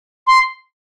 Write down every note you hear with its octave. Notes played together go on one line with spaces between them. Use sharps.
C6